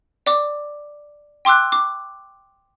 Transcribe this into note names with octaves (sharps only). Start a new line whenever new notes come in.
D5 D6
G5 C6 D6 E6 F#6
D6